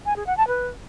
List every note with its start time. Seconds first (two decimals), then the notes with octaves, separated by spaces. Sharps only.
0.06 G#5
0.16 G#4
0.27 F#5
0.37 A5
0.48 B4